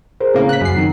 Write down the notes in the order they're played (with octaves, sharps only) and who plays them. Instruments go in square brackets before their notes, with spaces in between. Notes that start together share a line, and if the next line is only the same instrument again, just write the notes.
[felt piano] G#4 A#4 C5
[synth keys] A2 A#3 [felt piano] C#3
[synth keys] F#6 B6
F#2 C7
[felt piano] D#3